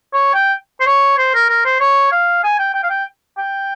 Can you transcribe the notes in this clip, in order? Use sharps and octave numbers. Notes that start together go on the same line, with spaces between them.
C#5
G5
C5
C#5
C5
A#4
A#4
C5
C#5
F5
G#5
G5
G5
F5
G5
G5